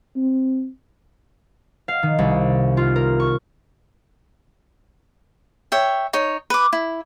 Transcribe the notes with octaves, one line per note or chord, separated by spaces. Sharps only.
C4
F5
D#3
C2
F4
A#4
C#6
C#5 E5 G5
D#4 C#5
B4 D6
E4